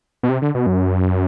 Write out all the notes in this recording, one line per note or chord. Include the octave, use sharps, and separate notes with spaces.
B2
C3
D3
B2
F#2